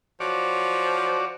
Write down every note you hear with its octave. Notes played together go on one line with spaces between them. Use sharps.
F3 F#4 C#5 D5